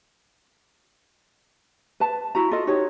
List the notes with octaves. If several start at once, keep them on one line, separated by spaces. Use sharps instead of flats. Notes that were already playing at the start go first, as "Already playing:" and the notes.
B4 A5
E4 F#4 A#5
F4 A4 D#5
D#4 F#4 G4 C#5